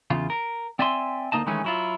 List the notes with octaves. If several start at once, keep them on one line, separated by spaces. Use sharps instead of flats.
E2 C#3 F4
A#4
C4 D5 E5 G#5 C6
D2 A#3 D#4 D#5 A5
D#3 E3 G#3 A3 C#4
F#3 E4 F4